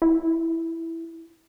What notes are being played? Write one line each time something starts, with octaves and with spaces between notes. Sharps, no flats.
E4